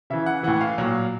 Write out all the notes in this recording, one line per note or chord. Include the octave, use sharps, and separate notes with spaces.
C#3 E3 E5
F#5
A2 E3 F#5
F5
A#2 F#3